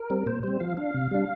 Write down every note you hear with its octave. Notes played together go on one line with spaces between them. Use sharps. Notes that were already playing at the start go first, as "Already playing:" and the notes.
Already playing: A#4
G3 C4
A#2 C5
G3 C4 C5
F3 F5
D4 F5
C3
G3 D4